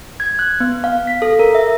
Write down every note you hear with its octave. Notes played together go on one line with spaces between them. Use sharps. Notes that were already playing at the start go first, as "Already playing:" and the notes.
G#6
F#6
B3
F5
B6
A4
A#4
E5